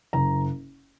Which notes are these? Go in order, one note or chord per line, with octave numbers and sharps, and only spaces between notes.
F#1 A#5